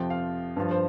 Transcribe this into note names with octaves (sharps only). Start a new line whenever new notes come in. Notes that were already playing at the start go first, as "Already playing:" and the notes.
Already playing: F2 C3 F3 G5
F5
G2 F3
C5